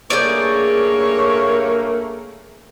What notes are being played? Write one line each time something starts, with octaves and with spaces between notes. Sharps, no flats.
G2 A3 A#3 C#4 G#4 C#5 D5 G6